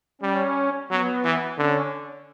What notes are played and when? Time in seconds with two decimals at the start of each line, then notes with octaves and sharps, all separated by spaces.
0.21 G3 C#4
0.90 F#3 B3
1.24 E3
1.58 D3 C#4